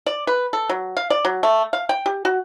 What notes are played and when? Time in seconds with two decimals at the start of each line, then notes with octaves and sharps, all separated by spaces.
0.06 D5
0.27 B4
0.53 A4
0.69 F#3
0.97 F5
1.10 D5
1.25 F#3
1.43 A3
1.73 F5
1.89 G5
2.06 G4
2.25 F#4